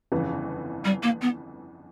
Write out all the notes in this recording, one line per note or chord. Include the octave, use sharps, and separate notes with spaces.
G1 F2 C#3 E3
G3
A#3
B3